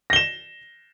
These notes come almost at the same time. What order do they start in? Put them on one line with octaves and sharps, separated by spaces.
A#6 G7 E7